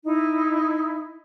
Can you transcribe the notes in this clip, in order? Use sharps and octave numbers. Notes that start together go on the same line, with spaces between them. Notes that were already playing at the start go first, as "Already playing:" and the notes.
D#4 E4